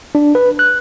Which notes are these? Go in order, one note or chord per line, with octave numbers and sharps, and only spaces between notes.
D4
B4
F#6